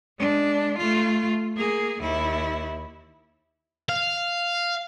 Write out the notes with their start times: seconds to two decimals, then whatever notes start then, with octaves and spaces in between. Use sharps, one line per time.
0.19 G#3 D4
0.78 A3 F4
1.57 A#3 G#4
2.01 D#2 E4
3.89 F5